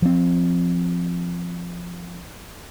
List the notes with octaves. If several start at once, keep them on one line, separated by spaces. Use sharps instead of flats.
F3 C4